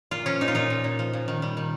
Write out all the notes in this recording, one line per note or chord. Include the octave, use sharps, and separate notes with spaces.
A#2 F4
F3 C#4
A#2 D#4
F4
A#2 D#4
A#2
A#2
F3
A#2
D#3
G3
D#3